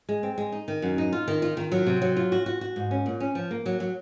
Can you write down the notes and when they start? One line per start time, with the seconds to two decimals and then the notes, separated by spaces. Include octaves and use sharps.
0.09 G#3
0.23 C4
0.38 G#3
0.52 D#4
0.68 D#3
0.82 F#2
0.98 D#4
1.12 F4
1.28 D#3
1.42 F4
1.57 D#3
1.72 F#3
1.87 C3
2.02 F#3
2.16 F4
2.32 F#4
2.46 F#4
2.61 F#4
2.76 G#2
2.91 C#4
3.06 A#2
3.20 C#4
3.35 F3
3.51 A#3
3.66 F#3
3.80 F#3